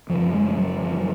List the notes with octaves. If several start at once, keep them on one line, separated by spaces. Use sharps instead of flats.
F#2 C#3 F3
G#3
G#3
F#3
F3
F#3